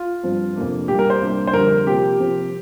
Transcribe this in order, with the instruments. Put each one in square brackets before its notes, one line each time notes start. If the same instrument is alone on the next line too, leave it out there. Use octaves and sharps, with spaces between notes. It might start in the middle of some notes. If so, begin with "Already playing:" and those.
Already playing: [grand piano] F4
[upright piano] G2 F3 C4
F2 C3 A#3 D4
[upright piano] A#2 G3 A#3 [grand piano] G4
[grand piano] A#4
C5
[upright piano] C2 A#2 A#3 D4
[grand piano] C5
[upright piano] F2 D3 G3 C4 [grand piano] A#4
[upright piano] C3 F3 A#3 [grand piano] G4
[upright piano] C3 F3 C4